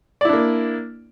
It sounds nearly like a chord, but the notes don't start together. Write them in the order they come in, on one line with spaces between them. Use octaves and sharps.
D5 E4 D4 A#3